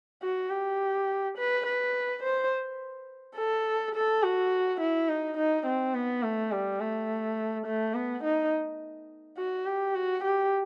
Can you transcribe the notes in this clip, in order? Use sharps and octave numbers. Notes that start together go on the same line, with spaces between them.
F#4
G4
B4
B4
C5
A4
A4
F#4
E4
D#4
D#4
C4
B3
A3
G3
A3
A3
B3
D#4
F#4
G4
F#4
G4